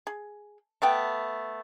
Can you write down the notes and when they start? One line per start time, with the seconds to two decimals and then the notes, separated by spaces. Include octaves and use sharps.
0.07 G#4
0.82 A3 B3 G5